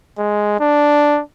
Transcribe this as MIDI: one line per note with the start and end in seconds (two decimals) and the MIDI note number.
0.18 0.55 56
0.60 1.20 62